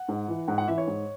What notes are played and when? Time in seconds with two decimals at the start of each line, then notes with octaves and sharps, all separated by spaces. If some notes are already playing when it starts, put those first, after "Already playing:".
Already playing: F#5
0.08 G#2
0.28 E3
0.48 G#2 F#5
0.58 F#5
0.68 E3 E5
0.78 C#5
0.87 G#2